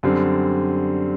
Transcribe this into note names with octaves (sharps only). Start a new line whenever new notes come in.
F#2 D3 G3 C4